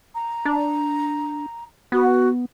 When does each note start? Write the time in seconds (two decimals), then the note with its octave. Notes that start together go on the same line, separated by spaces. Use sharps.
0.14 A#5
0.45 D4
1.92 B3 F#4